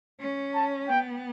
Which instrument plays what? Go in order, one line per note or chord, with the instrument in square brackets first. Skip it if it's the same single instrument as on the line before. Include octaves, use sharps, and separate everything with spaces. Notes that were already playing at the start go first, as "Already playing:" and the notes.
[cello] C#4
[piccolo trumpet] A5
[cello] B3 [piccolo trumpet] G5